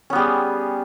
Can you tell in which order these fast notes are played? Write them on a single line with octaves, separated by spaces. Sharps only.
C#4 B3 G3 G#4